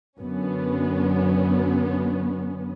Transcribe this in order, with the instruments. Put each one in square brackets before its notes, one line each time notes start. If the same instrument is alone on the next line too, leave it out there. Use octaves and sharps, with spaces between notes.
[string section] F#2 D3 B3 C#4